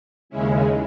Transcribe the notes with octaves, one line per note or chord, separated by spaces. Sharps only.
D#2 C#3 G#3 C#4 E4